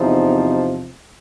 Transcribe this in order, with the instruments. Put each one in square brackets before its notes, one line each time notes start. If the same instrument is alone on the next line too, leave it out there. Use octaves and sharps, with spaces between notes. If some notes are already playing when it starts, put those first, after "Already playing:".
Already playing: [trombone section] E2 C3 F3 D#4